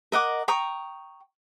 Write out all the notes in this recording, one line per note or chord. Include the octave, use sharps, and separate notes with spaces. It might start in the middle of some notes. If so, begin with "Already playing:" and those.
A#4 D#5 F#5 D6
G5 A#5 C#6 D#6